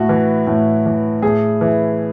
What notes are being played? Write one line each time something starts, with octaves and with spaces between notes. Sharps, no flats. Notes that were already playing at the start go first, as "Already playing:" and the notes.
Already playing: A2 F#4
E3
A2
E3
A2 G#4
E3